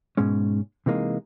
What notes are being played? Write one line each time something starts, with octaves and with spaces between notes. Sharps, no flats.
G#2 B2 G#3 C#4
C3 E3 G#3 A#3 D#4